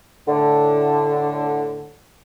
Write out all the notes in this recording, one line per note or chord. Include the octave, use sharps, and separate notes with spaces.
A2 D3